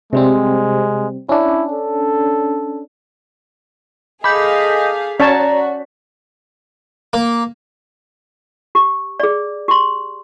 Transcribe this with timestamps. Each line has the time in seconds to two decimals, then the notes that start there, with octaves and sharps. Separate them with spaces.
0.13 C3 G3 G#3 C4
1.29 C#4 D4 E4
1.71 A4
4.24 G#4 A4 D#5 F5 B5 D6 G6 B6
5.20 C#4 F#4 C#5 D5 A5 A#5
7.13 A#3
8.75 G4
9.20 G#4 D5
9.68 G4 C6